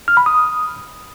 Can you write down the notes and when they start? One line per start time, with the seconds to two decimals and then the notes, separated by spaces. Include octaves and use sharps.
0.08 F6
0.17 B5
0.26 D#6